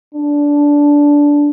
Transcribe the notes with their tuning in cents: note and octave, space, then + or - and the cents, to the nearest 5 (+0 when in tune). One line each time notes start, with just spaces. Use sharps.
D4 -15